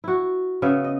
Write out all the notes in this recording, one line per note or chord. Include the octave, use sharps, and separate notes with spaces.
E4 F#4
C#3 B3 E5
D#5